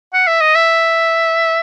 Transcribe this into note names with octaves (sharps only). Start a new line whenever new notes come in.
F#5
E5
D#5
E5